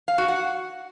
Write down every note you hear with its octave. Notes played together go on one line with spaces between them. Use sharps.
F5
F#4
F#5